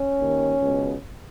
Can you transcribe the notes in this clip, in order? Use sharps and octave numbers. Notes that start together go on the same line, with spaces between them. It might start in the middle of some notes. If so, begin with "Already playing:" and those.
Already playing: C#4
D#2 D#3
C#2 B2